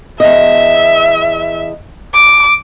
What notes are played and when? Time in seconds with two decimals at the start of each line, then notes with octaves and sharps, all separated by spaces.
0.20 E2 D#5 E5
2.14 D6